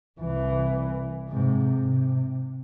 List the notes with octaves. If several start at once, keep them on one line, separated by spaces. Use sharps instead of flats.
C2 E3
G#2 C3
C3